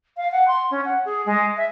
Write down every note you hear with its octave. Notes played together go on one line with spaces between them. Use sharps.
F5
F#5
C6
C#4
F#5
G#4
G#3
E5